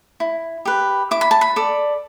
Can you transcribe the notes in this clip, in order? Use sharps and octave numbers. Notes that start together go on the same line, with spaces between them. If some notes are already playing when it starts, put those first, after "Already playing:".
E4
G4 B4
E4 D6
B5
A5
B5
A4 D5